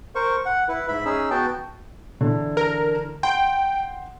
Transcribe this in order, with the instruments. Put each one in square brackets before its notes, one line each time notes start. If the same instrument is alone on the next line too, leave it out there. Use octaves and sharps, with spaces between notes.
[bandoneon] A#4 C5 C#6
F#5
E4 B4
G#2 E5 B5
C#4 D#4 G#4 E6
B3 F#4 G5 A5
[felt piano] D3 E3 D4
[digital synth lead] A#4
[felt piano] F#5 C6 [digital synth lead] G5